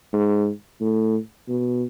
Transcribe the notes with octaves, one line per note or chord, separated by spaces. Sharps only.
G#2
A2
B2